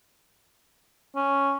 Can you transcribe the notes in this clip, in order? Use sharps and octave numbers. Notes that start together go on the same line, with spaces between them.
C#4